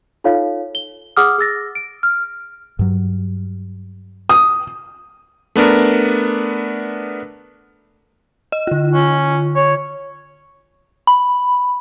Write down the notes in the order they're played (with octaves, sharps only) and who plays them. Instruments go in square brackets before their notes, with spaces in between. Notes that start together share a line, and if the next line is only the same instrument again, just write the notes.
[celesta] D#4 F4 A4 C#5 F5
G7
G#4 F#5 D6 D#6 F6
G#4 E6 A6 A#6
D7
F6
[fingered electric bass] G2 F#3
[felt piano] D#6
[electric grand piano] A3 B3 D4 A#4
[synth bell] D#5
D3 F4
[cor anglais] C#4
C#5
[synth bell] B5